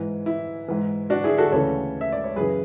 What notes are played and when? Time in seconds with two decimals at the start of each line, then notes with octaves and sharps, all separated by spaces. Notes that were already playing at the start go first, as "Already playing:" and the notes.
Already playing: G#2 E3
0.26 E4
0.68 G#2 E3
1.10 D4 F#4
1.24 E4 G#4
1.38 F#4 A4
1.52 D2 C#3 E3 A4 C#5
2.01 E5
2.12 D5
2.24 C#5
2.36 F#2 C#3 E3 G#4 B4